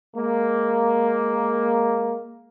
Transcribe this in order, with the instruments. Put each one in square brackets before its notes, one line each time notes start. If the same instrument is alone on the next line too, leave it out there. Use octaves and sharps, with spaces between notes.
[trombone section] G#3 A#3